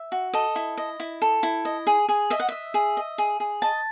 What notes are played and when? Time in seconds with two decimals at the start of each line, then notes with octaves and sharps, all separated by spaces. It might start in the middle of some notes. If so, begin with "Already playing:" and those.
Already playing: E5
0.12 F#4
0.34 A4 D#5
0.56 E4
0.78 D#5
1.00 E4
1.22 A4
1.43 E4
1.65 D#5
1.87 G#4
2.09 G#4
2.30 D#5 E5
2.40 F#5
2.49 D#5 E5
2.74 G#4
2.97 D#5
3.18 G#4
3.40 G#4
3.62 D#5 A5